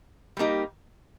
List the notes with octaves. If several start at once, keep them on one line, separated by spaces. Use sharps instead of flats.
G3 A#3 D#4 G4